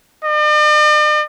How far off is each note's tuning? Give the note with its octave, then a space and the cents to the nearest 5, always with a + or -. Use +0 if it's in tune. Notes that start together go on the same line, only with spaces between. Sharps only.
D5 +45